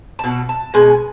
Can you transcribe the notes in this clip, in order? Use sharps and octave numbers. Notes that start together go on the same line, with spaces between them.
A5
B2 F#3
A5
B2 G#3 G#5